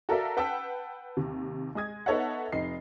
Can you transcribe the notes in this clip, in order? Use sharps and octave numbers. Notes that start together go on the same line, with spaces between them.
F#4 A4 A#4 D5 E5 F5
B4 F#5 G5 A5 E6 B6
D#2 C3
G#3 D#5 D#6 G#6
B3 D#4 A4 C#5 E5 F#5
F1 D#4 C7